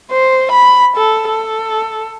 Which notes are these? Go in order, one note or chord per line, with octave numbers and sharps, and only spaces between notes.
C5
B5
A4
A4